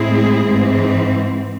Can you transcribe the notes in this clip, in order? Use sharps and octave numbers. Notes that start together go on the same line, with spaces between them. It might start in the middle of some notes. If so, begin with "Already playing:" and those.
Already playing: A2 G#3 C4 E4 G#4
G#2 E3 C4